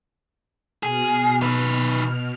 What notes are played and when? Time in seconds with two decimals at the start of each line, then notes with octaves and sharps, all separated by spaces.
0.83 B2 G#4 F6
1.42 D#3 B4